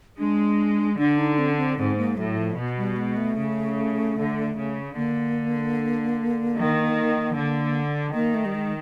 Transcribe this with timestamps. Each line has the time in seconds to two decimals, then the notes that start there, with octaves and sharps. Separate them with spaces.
0.18 G#3 D4
0.98 D3 D4
1.18 D#4
1.38 C4
1.50 C#4
1.57 C4
1.77 G#2 C4
1.97 A#3
2.17 A2 F#3
2.37 F3
2.57 B2
2.78 G3
2.96 G#3
3.17 A3
3.37 C#3
4.17 D3
4.56 C#3
4.96 D3 A#3
6.55 D#3
7.34 D3
8.14 D#3 A#3
8.34 A3
8.45 G3
8.54 G#3